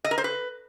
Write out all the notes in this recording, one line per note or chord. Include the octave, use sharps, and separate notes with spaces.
D#5
A#4
C5
B4